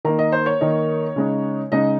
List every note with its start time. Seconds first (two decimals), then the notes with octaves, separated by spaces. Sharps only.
0.05 D#3 A#3 D#4 A#5
0.19 D#5
0.32 C5
0.46 C#5
0.61 D#3 A#3 D#4
1.16 C#3 G#3 D#4
1.72 C#3 G#3 D#4 D#5